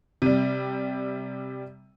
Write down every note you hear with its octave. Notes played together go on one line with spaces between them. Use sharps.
C3 G3